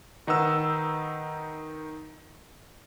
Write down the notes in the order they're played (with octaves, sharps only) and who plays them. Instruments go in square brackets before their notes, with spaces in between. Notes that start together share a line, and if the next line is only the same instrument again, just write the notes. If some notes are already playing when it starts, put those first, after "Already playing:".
[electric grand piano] D#3 D#4 B4 F#5 E6